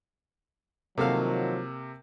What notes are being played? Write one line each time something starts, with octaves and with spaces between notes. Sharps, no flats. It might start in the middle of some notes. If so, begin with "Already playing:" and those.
C3 D#3 F3 F#3 A#3 A4 F5